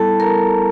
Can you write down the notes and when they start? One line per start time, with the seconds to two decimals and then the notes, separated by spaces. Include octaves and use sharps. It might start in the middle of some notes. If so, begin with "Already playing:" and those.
Already playing: G3 B3 E4 A4 A5
0.20 A#4 A#5